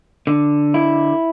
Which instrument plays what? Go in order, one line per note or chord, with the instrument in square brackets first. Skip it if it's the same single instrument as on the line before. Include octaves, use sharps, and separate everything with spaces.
[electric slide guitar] D3
E4